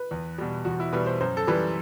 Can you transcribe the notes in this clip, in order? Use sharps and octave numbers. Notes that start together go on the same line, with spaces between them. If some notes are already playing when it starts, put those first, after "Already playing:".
Already playing: B4
E2
B2 G3
E2 F#4
E4
B2 G3 B4
C5
F#2 C5
A4
E3 G3 B4